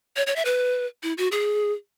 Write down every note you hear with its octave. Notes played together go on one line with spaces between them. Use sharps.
C#5
C#5
E5
B4
E4
F#4
G#4